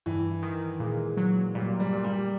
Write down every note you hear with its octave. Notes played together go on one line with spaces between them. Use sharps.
G2 E3
D#3
A#2 G#3
F#3
A#2 G3
G3
A#2
G3